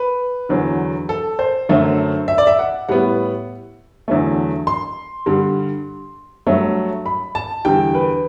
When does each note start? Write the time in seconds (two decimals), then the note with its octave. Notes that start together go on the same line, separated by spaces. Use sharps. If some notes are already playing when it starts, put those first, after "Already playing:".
Already playing: B4
0.49 E2 D3 F#3
1.09 A4
1.39 C5
1.69 F#2 D3 F#3 A3
2.28 E5
2.38 D5
2.47 E5
2.59 F#5
2.89 A2 G3 B3 F#5
4.08 E2 D3 F#3 A3
4.67 C6
5.26 G2 D3 G3
6.47 G2 F#3 A3
7.06 B5
7.35 A5
7.65 E2 D3 G3 G5
7.95 B4